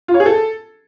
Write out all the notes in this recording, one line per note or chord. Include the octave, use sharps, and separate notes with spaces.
F4
C#5
G#4
A4